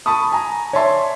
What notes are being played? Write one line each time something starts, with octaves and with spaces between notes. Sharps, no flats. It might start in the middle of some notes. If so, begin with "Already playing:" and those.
A5 B5 C#6 D#6
G#5 A#5
C#5 D5 E5 A5 C6